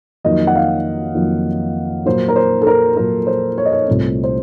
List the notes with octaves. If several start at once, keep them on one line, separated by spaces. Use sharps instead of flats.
F2 D#3 F#3 A#3 D#5
F#5
F5
F2 D#3 F#3 A#3
A#2 F#3 A#3 C5
A#4
C5
A4
A#4
A#2 F#3 A#3 A#4
C5
C#5
D#5
C#5
C2 A#2 A3 C4
C5